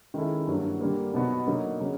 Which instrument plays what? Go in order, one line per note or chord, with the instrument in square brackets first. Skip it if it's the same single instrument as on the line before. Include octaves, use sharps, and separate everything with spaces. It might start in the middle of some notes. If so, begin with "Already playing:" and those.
[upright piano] D#3 G#3 C#4 E4 A4
G2 D3 F#3 A#3
D3 G3 A#3
B2 F#3 B3 D#4 F#4
D3 F#3 A#3 D#4
C#3 F#3